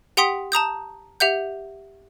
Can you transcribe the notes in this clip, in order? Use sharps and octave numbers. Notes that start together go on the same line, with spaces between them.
G4 F#5 G5 C6 D#6 B6
A5 A#5 D#6 G6
G4 E5 F#5 G6